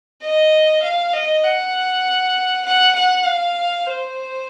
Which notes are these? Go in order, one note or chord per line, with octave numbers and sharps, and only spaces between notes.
D#5
F5
D#5
F#5
F#5
F#5
F5
C5